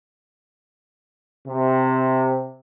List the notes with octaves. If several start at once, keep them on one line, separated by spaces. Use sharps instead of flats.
C3